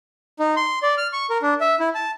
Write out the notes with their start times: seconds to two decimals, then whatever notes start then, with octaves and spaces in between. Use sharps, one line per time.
0.39 D#4
0.57 C6
0.83 D5
0.98 F6
1.13 C#6
1.30 A#4
1.42 D4
1.61 E5
1.80 E4
1.95 A5